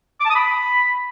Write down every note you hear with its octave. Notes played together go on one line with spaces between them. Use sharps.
D6
A5
D#6
B5